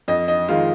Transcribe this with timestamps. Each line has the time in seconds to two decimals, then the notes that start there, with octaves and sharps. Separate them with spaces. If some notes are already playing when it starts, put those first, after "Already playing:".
0.08 F2 D#5
0.28 D#5
0.48 D#3 G#3 F4